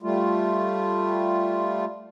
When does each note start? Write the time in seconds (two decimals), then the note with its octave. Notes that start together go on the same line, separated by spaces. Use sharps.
0.02 G3 A3 F4